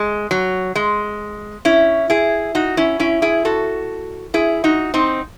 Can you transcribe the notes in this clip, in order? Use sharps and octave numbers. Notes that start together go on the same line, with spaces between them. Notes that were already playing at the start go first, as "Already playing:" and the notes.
Already playing: G#3
F#3
G#3
C#4 E4
E4 G#4
D#4 F#4
C#4 E4
C#4 E4
E4 G#4
F#4 A4
E4 G#4
D#4 F#4
C4 D#4